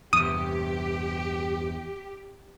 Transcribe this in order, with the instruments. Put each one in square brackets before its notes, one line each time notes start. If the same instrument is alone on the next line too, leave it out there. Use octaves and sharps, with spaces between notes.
[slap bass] E2 G2 C3 [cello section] G4 [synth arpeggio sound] D#6